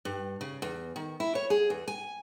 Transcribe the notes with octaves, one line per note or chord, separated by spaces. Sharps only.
G2
C#3
E2
D#3
E4
C#5
G#4
E2
G#5